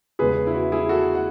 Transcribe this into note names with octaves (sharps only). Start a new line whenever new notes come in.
E2 C#3 G#3 G#4 B4
E4
F#4
E4 G#4
F#4 A4
F#5